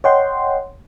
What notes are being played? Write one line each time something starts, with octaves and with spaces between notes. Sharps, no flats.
C#5 D#5 F#5 G5 C6